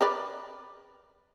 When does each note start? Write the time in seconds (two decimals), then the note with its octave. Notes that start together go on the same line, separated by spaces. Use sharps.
0.01 A#4 B4 D5